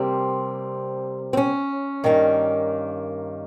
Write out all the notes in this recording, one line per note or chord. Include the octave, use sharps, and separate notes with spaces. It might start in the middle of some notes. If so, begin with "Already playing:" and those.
Already playing: C3 G3 A#3 C4
C4
C#4
G2 D#3 A#3